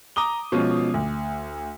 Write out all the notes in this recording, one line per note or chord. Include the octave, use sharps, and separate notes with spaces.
A#5 D6 D#6 G7
B2 F3 G#3 C#4 F4
D2